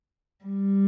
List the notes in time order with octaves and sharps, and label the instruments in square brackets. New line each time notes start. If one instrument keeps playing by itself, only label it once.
[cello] G3